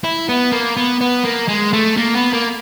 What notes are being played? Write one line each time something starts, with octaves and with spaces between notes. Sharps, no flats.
E4
B3
A#3
B3
B3
A#3
G#3
A3
A#3
B3
A#3